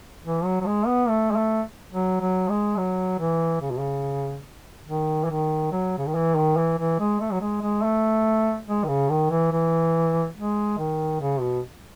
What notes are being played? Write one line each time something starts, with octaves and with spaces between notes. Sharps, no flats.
E3
F#3
F#3
G#3
B3
A3
G#3
A3
F#3
F#3
G#3
F#3
E3
C#3
B2
C#3
D#3
E3
D#3
F#3
C#3
D#3
E3
D#3
E3
E3
G#3
A3
F#3
G#3
G#3
A3
G#3
D#3
C#3
D#3
E3
E3
G#3
D#3
C#3
B2